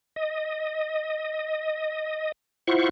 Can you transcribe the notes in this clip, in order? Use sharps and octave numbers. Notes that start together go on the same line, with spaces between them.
D#5
E4 F4 C5 F#5 C#6